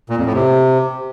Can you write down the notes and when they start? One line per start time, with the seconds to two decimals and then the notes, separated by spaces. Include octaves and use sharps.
0.10 A#2
0.18 F2
0.26 A2
0.34 C3